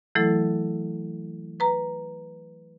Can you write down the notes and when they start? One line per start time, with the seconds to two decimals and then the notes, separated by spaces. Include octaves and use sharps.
0.15 E3 F#3 A3 E4 A4
1.60 B4 A#5